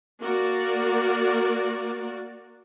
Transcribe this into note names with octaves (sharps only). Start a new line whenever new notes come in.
A#3 F#4 A#4 D5